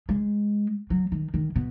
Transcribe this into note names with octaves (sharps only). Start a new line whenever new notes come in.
G#3
F#3
D#3
D#3
B2